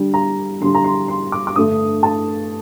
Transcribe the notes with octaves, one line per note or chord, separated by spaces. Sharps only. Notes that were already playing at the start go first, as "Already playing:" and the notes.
Already playing: D3 G3 D4
A#5
D3 G3 D4 C6
A#5
C6
C6
D6
D6
G2 D3 A3 D4 D#6
A5